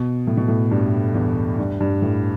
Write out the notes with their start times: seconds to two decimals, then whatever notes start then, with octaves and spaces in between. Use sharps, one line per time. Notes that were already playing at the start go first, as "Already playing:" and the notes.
Already playing: B2
0.27 A2
0.37 B2
0.48 A2
0.71 G2
1.14 E2
1.59 G2
1.80 G2
2.02 A2